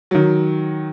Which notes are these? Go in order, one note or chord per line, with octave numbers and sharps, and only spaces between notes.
D#3 F#3